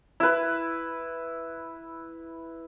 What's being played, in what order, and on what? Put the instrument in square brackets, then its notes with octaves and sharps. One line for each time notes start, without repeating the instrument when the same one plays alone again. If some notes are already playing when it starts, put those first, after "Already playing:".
[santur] E4 B4